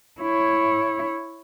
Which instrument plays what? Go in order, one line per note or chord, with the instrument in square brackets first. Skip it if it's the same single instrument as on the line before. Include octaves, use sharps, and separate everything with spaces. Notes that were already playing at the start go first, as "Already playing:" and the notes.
[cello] E4 C#5